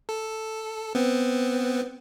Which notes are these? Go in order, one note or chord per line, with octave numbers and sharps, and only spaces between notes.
A4
B3 C4